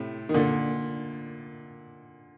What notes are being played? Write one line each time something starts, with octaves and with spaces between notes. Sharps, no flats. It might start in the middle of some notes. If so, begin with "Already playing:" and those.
Already playing: A2 C3
D#3
A#2 D3